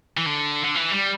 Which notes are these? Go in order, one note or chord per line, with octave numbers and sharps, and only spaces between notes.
E3
D3
D3
E3
G3